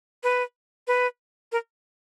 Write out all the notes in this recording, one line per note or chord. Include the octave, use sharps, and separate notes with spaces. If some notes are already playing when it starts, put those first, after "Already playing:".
B4
B4
A#4